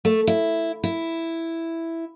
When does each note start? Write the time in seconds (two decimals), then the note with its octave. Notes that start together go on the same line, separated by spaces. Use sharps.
0.05 A3
0.27 E4
0.84 E4